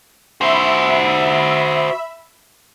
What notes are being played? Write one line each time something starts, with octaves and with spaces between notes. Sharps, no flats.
F#4 C5 E5 B5 E6